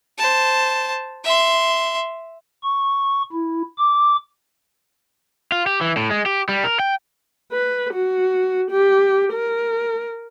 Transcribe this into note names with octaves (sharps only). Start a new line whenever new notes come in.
C5 A5
E5 C6
C#6
E4
D6
F4
G4
E3
A2
G#3
G4
G3
A#4
G5
B4
F#4
G4
A#4